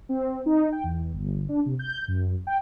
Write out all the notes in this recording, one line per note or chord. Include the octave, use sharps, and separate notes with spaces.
C4
D#4
G5
E2
G1
D4
C3
G6
F#2
G5